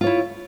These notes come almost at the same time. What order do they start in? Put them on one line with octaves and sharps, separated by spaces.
F4 C#5 E4